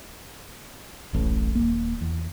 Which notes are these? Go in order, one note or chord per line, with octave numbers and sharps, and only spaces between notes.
D1 A1 A2
D#1 A#3
E2